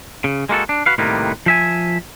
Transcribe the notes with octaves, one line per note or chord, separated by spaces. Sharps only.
C#3
G#3 A#3 F#4 A4
D4
F#4 B4 F5
A2 C3 D#3 G3 A#3 B3
F3 E5 G#5